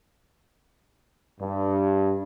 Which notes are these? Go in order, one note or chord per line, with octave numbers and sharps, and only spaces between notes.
G2